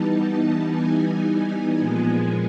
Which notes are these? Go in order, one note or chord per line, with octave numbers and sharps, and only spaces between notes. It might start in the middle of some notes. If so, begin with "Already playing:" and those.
Already playing: E3 G3 B3 D#4 A5
G#5
A#2 F3 G#3 B3